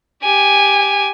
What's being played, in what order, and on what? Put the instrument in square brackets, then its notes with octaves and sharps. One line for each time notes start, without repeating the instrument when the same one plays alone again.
[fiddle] G4 G#5